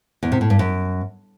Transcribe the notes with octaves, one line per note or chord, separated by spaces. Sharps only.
E2
C3
A2
G2
F#2